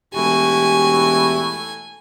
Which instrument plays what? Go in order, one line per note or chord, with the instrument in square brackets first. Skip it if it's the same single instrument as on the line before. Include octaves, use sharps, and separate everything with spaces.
[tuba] E1 [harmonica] A3 E4 F#4 [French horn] G4 [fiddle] G#5